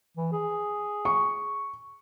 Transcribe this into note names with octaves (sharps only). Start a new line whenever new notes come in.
E3
G#4
C#6